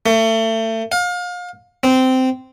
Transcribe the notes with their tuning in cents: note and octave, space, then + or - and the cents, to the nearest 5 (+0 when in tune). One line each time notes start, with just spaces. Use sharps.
A3 +30
F5 +35
C4 -15